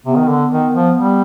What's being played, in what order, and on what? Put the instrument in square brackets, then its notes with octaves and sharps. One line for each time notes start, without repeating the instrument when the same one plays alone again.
[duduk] C3 [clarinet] B3
[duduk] D#3
D3
D#3
F3
G3